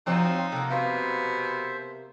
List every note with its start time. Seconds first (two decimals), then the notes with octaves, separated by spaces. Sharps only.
0.07 F3 C4 D#4 F4 F#4 C#5 C6 E6
0.52 C3 A#3 A4 F#5
0.70 B2 C5 E5 F5